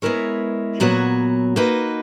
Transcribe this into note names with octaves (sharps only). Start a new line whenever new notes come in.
G#3 B3 E4 A#4 C#5
A#2 F#3 B3 F#4 C#5
A#3 D#4 F#4 B4